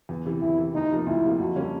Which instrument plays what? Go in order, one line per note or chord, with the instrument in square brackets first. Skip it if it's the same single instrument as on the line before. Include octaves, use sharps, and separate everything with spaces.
[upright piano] E2
C3 E3
[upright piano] E2 [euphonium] E4
[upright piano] C3 E3
[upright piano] D2 [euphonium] D#4
[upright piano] C3 F3 A#3
[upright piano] D2 [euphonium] E4
[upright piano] C3 F3 A#3
[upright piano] F2 [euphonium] F#4
[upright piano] D3 G3 A#3 C#4